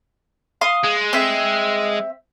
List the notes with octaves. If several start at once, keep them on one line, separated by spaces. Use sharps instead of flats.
F5 C6 D#6
G#3
C4 E5